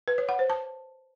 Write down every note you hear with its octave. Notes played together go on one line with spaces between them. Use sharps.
B4
C#5
F#5
C5
A5